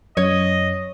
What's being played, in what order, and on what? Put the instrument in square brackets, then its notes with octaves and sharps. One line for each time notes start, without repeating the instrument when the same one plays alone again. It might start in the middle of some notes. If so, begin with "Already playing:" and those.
[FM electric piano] F#2 [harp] C#5 [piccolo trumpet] D#5